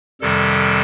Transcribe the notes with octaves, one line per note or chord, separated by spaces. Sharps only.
F2 C3 D#3 G3 A4